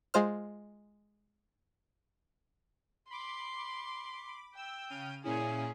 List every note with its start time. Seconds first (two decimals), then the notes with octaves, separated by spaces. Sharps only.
0.14 G#3 F4 C5 F6
3.10 B5 C6 D6
4.56 G5 E6
4.89 C#3 F6 D#7
5.24 A#2 C#4 E4 G#4